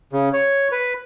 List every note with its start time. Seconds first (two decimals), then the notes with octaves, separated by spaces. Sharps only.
0.13 C#3
0.33 C#5
0.72 B4